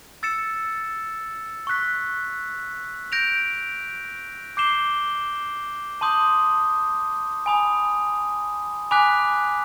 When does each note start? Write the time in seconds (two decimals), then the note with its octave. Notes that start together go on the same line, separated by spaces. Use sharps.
0.23 E6 A6 C#7 E7
1.67 C#6 F#6 B6
3.12 G6 A#6 D7 F7
4.57 D6 G6 C7 E7 G7
6.01 A5 C6 D#6 G6
7.46 G#5 B5 D#6
8.91 G#5 B5 D6 F#6 B6